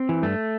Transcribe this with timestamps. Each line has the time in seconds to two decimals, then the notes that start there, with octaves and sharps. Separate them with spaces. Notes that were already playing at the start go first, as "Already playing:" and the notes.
Already playing: C4
0.09 E3
0.23 G2 A3